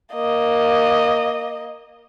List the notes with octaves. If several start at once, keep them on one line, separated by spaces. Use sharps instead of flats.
A#3 D#5